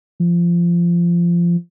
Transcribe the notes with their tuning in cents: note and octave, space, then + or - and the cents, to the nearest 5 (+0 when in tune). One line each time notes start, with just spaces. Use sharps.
F3 -20